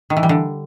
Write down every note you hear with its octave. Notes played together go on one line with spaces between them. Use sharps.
D#3
E3
G3
D3